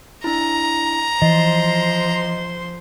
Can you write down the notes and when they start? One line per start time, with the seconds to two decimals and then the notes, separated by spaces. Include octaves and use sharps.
0.24 D4 E4 A#5
1.22 E3 F3 C5 D#5 C6